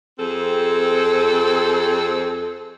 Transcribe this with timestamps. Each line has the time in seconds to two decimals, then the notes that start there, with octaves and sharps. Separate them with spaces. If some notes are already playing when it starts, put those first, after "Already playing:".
0.18 F2 C4 G#4 A4